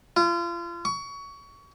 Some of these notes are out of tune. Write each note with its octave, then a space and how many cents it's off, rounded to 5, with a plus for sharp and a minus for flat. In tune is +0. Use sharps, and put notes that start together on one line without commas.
F4 -35
C#6 +25